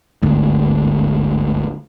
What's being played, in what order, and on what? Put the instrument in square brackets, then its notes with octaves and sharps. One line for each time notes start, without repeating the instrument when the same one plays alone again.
[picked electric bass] G1 D2 G#2